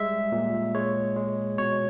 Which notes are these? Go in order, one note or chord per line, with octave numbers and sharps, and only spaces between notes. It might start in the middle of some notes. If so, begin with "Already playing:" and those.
Already playing: G3 G#3 E5
A#2
G#3 C#5
G#3
B2 C#5